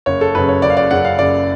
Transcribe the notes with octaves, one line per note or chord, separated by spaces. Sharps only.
F#1 C#5
A4
F#2 C#3 B4
C#5
F#1 D5
F5
D5
F#2 C#3 F#5
F5
F#1 D5